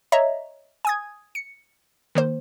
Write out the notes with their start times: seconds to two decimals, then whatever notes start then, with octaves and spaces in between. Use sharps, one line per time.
0.12 C#5 D#5 E5 A#5
0.85 G#5 D#6 G#6
1.35 C#7
2.15 D#3 A#3 C5